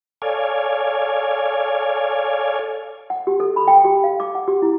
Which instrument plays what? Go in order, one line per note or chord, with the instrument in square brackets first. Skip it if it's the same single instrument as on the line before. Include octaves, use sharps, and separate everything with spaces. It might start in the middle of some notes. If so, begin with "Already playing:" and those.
[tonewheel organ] A4 C#5 D5 F5 G#5
[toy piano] F#5
G4
A4
B5
G5
G4
F5
D6
F#5
G4
E4